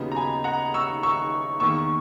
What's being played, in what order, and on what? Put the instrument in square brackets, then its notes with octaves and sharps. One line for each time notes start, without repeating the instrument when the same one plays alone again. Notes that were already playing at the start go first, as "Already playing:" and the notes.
Already playing: [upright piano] D#2 C#3 F#3 B3 D#4
A#5
G#5 B5
F#5 A#5
C#6 E6
C#6 E6
E2 D#3 A#3 C#6 E6